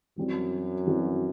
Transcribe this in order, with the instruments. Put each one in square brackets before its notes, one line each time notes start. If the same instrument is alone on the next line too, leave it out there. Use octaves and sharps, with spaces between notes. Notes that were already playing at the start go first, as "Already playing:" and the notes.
[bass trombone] F#2 [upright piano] E3 G3 C4 F#4
[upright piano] E3 G3 C4 F#4